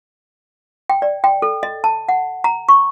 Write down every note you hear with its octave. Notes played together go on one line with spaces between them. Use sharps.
G5
D5
G5
A4
D#5
A5
F#5
A#5
C#6